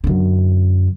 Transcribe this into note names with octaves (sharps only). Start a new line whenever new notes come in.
F#2 D3